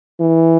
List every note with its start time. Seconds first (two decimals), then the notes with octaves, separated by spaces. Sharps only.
0.20 E3